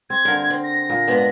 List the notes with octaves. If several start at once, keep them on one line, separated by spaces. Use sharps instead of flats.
C4 G#6
G2 D3 A#4
C4
A#6
A#2
G#2 B3 D4